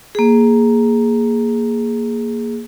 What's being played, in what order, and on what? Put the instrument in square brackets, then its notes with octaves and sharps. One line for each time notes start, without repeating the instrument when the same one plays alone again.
[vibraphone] A#3 G#4